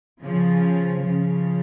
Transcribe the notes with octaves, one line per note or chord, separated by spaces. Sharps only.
C#3 F3
C#3 F3